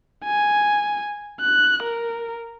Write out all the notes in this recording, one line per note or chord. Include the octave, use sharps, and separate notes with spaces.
G#5
F#6
A#4